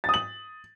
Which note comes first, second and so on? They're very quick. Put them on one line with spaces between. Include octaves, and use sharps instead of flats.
A6 D#6 F#7